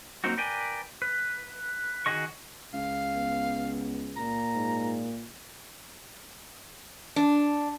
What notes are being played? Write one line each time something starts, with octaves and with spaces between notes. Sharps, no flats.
F#3 A#3 C4 D#4 F#4
A#4 B4 D5 G5 G#5
B4
D#3 F#4 G#4 D#5 C#6
C#2 F5
B3
A#2 A#5
G#2
D4